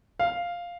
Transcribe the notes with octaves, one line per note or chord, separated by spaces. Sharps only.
F5